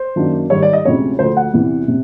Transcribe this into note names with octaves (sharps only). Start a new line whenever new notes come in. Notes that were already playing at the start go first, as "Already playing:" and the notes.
Already playing: C5
F#2 D#3 F#3 A#3 D4
G#2 D#3 G3 C#5
D5
D#5
D2 C3 F3 G#3 C#4 C#5
D2 D3 F3 A3 C5
F#5
E2 C3 E3
C3